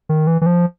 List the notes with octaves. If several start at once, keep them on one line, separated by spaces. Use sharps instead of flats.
D#3
E3
E3
F3